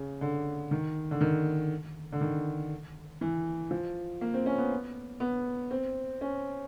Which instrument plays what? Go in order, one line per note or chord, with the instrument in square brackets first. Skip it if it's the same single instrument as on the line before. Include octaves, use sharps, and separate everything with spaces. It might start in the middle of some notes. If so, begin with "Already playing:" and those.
Already playing: [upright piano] C#3
D3
D#3
D3
D#3
D3
D#3
E3
F3
A#3
C4
C#4
B3
B3
C4
C#4